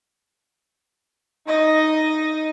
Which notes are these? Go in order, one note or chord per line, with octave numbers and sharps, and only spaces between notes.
D#4 D#5